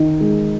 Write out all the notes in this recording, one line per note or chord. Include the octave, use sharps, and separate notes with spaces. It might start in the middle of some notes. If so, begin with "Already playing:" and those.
Already playing: D#3 D#4
G#3